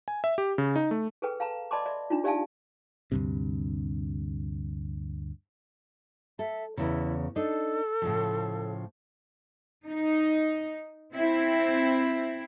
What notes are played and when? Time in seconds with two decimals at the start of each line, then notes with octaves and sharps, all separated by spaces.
0.08 G#5
0.24 E5
0.38 G4
0.58 C#3
0.76 D#4
0.91 A3
1.22 G#4 A4 B4 G5
1.40 F5 A5 A#5
1.71 D5 D#5 A5 B5 C6 D6
1.86 D5 E5
2.10 D4 D#4 F4
2.24 G4 D5 E5 F5 G#5 A5
3.12 D2 G2 C3
6.39 A4 E5
6.77 E2 C#3 E4
7.36 D4 D#4 A4
8.02 A2 C#3 F3
9.88 D#4
11.14 C4 E4